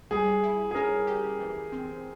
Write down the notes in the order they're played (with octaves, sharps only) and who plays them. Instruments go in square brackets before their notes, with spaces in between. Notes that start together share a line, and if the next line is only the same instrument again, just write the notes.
[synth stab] G3 [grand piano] G#4
[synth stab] E4
[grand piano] G#4
[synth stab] C#4 [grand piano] A#4
[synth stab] G4
E3
C4